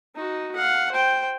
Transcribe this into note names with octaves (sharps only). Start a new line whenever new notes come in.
D#4 F#4
F5 F#5
C5 G5